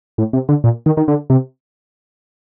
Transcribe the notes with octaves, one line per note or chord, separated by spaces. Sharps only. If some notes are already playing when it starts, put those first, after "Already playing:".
A2
C3
D3
A#2
D#3
D#3
D3
C3